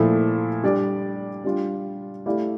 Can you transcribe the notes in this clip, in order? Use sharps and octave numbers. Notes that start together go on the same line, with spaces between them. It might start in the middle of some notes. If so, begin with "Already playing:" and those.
Already playing: A#2 F3 A3 E4 A4
G3 D4 G4 D5
G3 D4 F4
A3 E4 G4 D5 F5